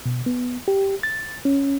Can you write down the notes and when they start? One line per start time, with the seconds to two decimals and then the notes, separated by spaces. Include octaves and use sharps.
0.06 B2
0.26 B3
0.68 G4
1.03 A6
1.45 C#4